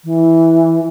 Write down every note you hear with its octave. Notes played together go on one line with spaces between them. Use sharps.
E3